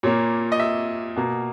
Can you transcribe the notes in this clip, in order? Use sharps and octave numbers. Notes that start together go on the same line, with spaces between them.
A#2 A#3 C#5
D#5
E5
B2 A#3